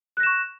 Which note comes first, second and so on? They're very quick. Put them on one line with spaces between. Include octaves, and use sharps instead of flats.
F#6 A#6 E7 C#6